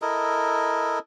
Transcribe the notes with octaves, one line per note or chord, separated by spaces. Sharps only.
E4 A4 A#4 D#5